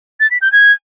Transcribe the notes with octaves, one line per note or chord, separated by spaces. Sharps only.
A6
B6
G6
G#6